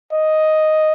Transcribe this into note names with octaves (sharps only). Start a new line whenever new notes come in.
D#5